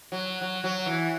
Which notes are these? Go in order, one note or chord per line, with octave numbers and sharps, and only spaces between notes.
F#3
F#3
F#3
E3